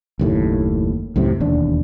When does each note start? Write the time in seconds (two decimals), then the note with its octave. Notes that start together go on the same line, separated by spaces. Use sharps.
0.19 F#1 D#2 A2
1.16 C#2 F#2 A2 C3
1.40 E1 D#2 D4